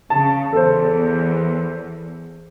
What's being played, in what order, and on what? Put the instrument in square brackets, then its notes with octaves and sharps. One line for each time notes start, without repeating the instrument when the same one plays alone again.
[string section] C#3 [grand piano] A5
[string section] E2 [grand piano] A4 C5